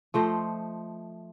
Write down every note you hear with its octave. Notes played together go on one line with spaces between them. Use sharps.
F3 A3 C5 D#5